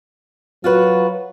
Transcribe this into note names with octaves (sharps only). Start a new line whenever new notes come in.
F#3 F4 F#4 B4